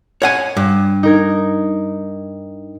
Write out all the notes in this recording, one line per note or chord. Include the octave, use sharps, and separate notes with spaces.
C#5 F#5 G#5
G2
D#4 A#4 G#6